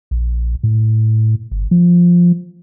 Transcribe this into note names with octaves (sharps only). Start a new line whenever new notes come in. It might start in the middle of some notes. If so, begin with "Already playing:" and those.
A#1
A2
G1
F3